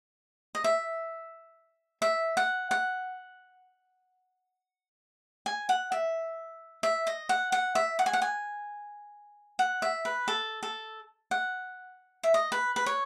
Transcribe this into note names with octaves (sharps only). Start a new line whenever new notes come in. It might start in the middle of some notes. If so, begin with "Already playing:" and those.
D#5
E5
E5
F#5
F#5
G#5
F#5
E5
E5
D#5
F#5
F#5
E5
F#5
G#5
F#5
G#5
F#5
E5
B4
A4
A4
F#5
E5
D#5
B4
B4
C#5